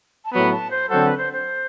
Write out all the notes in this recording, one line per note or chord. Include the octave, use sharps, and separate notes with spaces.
A5
A2 F#3 B3 B5
A5
C5
D3 F#3 C4 F#4 A4 C5
B4
C5
C5